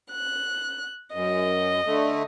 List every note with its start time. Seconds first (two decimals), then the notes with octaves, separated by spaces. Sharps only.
0.11 F#6
1.13 F#2 D#5
1.86 D3 A3